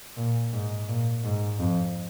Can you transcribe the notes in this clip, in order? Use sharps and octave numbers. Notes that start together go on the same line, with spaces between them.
A#2
G#2
A#2
G#2
F2